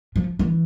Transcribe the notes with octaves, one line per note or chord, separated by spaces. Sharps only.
F3
E3